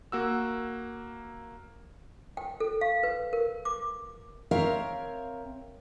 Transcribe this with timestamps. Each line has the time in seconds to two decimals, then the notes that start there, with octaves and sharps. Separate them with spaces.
0.12 A#3 F#4 E6
2.37 G5
2.60 A4
2.81 F5
3.03 B4
3.33 A#4
3.65 D6
4.51 C4 A#4 C#5 E5 F5